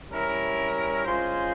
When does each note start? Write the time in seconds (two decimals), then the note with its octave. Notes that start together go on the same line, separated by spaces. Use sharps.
0.10 G3 C#4 E4 A#4
1.04 G#3 C#4 F4 C5